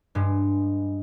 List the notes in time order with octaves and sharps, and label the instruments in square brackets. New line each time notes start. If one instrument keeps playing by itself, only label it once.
[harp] G2 G#3